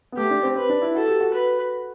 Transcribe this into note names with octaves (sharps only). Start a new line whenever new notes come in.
B3
A3 G4
D4
C4
C4 B4
D4
E4
F#4 A4
G4
F#4
B4